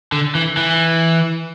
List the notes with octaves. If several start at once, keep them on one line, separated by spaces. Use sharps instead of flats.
D3
E3
E3